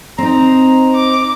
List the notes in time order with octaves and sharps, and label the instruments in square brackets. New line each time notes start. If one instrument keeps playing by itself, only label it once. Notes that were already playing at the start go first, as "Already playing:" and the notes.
[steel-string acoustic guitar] C4 D#4 [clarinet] A#5
[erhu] D6